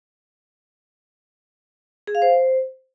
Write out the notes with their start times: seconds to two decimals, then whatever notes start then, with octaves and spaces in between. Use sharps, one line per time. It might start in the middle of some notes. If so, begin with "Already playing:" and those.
2.07 G#4
2.15 F5
2.22 C5